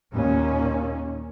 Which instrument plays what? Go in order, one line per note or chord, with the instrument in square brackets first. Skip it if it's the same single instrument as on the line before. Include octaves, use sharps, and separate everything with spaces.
[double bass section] D#2 A#2 A#3 C#4